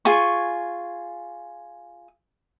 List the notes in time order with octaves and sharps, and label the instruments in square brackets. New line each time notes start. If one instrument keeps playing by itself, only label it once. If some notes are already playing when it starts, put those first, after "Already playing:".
[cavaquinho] F4 G#4 G#5 C#6